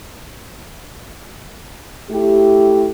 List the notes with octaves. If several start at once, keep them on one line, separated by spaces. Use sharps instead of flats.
A3 E4 G4